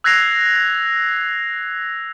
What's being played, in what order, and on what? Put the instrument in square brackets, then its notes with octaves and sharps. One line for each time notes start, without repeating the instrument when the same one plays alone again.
[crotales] E6 F#6 G#6 A#6 C7 F7